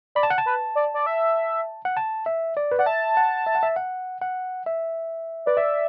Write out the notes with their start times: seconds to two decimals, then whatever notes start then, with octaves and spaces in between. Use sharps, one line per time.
0.15 D5 B5
0.23 A5
0.30 F#5
0.38 A5
0.46 B4
0.75 D5
0.94 D5
1.06 E5
1.85 F#5
1.97 A5
2.26 E5
2.57 D5
2.72 B4
2.79 D5 F#5
2.86 E5 A5
3.17 F#5
3.47 E5
3.55 F#5
3.63 E5
3.76 F#5
4.22 F#5
4.66 E5
5.46 B4 D5
5.57 D5 E5